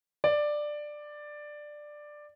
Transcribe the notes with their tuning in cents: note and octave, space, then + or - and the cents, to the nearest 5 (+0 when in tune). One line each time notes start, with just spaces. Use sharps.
D5 +10